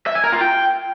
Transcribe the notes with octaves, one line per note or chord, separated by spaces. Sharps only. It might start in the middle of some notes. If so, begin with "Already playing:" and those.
E5
G#5
A#4
F4
G5